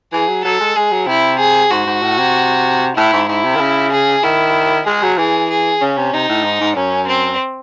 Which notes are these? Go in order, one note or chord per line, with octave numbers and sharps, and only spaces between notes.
E3 G#4
F#3
F#3 A4
G#3
G#3 G#4
F#3
C3 E4
G#4
G#2 F#4
G#2
A2
C3
A2 E4
G#2
G#2 E4
C3
D#3
C#3
G#4
D#3 E4
G#3 G#4
F#3
E3 G#4
G#4
C#3 C#4
C3
C3 D#4
A2
G#2
G#2
F#2 C#4
C4